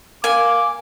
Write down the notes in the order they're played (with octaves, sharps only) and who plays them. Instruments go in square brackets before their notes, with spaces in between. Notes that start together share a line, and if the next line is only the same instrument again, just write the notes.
[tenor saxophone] A#3 [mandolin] G#5 [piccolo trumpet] D6